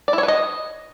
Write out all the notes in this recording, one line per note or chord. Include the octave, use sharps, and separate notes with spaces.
D5
E4
C#5
B4
D#5